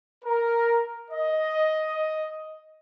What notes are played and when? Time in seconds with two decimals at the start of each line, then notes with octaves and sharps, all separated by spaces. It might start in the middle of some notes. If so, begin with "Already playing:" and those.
0.25 A#4
1.11 D#5